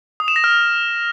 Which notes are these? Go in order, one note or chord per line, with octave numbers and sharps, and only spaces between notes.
D#6
E7
A#6
F6